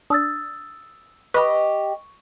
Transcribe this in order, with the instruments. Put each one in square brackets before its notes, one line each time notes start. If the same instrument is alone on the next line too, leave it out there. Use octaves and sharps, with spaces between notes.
[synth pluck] D4 [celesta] D#6 E6 A6
[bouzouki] G4 D#5 [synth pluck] B4 [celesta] C#6